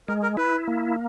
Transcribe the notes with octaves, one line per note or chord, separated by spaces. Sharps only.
G#3 A#4
A#4
E4 B4
A#3